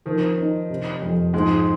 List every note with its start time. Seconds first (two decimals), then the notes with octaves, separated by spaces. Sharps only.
0.06 D#3 F3
0.38 D#4
0.70 C3
1.02 F2
1.33 G#2 F3 G#3